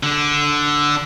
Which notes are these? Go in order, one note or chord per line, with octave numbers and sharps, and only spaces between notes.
D3 D4